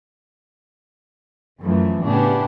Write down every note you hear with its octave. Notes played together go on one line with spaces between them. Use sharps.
F#2 E3 F3 A3
A2 C#3 B3 D4 G4 G#4